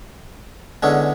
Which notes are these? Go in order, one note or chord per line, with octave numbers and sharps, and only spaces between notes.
E2 D3 G#3 C#4